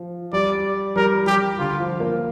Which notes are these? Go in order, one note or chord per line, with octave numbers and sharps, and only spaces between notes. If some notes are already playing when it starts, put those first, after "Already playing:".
Already playing: F3
G3 D5
G3 A#4
G3 G4
D3 F4
F3
A#3